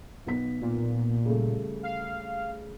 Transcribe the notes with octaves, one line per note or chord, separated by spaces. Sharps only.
B1 B3 B6
A#2
C#3 G3 A3
F5